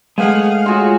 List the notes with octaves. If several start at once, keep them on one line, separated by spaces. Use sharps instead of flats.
G#3 A3 G#4 B4 F5 F#5
F4 F#4 G#4 C#5